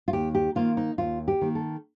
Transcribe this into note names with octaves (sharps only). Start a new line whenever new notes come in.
F4
D#2 G4
G4
D#3 A#3 F4
D#4
D#2 F4
G4
D#3 A#3
A4